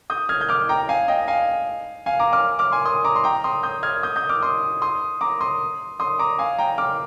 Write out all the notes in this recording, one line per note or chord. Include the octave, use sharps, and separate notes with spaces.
D#6 G6
F6 G#6
G6
D6 F6
G5 A#5
F5 G#5
D#5 G5
F5 G#5
F5 G#5
A#5 D6
D6 F6
D6 F6
G#5 C6
C6 D#6
A#5 D6
C6
G5 A#5
C6 D#6
D#6 G6
F6 G#6
D#6 G6
D#6 G6
D6 F6
C6 D#6
C6 D#6
A#5 D6
C6 D#6
C6 D#6
A#5 D6
F5 G#5
G5 A#5
D6 F6